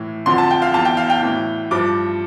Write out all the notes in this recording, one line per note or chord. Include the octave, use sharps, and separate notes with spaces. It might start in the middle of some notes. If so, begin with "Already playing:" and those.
Already playing: A2 E3
F2 D3 F3 C6
A5
G5
F5
E2 E3 A5
G5
F5
G5
A2 E3
G2 F3 D6